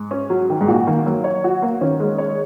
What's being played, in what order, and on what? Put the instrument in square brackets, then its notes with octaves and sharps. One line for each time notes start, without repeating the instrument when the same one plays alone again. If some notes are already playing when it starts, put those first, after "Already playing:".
Already playing: [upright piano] G#2
[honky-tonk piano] C#4
F#3
D#3
[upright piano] G#2
[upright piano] A#2 [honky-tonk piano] F#4
[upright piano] D#3 [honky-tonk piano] A#3
[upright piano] F#3 [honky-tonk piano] A#3
[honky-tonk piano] C#5
F#4
A#3
[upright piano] D#3 [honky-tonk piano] C#4
[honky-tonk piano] G#3
C#5